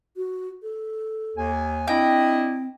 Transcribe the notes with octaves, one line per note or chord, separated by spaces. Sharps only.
F#4
A4
D#2 G#5
C4 D4 E4 D#5 G5